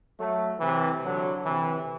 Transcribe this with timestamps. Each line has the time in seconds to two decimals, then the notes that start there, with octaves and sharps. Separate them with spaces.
0.19 F#3 A3
0.60 C3 E3
1.02 D3 F#3
1.44 C3 E3